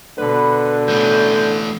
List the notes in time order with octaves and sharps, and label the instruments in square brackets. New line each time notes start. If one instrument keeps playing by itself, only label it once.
[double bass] B2 [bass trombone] D3 [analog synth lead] B4
[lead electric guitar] E3 A3 [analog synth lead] G6